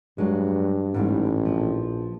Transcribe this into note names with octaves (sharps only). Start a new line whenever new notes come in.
G2 F#3 G#3
A1 G#2 G3 A3
A#1 F3